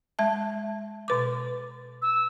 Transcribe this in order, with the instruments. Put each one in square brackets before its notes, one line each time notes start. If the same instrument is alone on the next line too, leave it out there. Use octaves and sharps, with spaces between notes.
[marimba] G#3 E5 A5
B2 B4 D6
[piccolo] E6